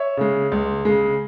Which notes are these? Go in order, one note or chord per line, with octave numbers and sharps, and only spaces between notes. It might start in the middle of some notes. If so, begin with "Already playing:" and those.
Already playing: C#5 E5
C#3 G#3
C#2
C#3 G#3